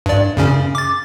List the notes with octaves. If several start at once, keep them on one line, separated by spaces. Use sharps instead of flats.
G2 D5
F#2 C#3 C#4
D6 A6